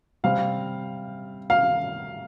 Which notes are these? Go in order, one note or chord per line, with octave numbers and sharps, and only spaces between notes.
C3 G3 C4 F5
F5